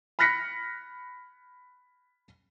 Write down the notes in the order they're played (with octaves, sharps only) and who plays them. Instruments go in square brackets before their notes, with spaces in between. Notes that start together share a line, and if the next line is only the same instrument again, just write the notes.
[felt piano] B5 F6 F#6 A#6 B6 C#7